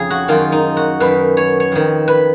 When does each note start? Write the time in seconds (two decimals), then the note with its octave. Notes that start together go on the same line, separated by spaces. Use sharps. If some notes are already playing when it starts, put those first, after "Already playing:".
Already playing: F2 C#3 G#4
0.10 F#4
0.28 F#2 D#3 F4
0.52 D#4
0.77 F#4
1.00 F#2 D#3 B4
1.37 C#5
1.60 C#5
1.72 F2 D#3
2.08 B4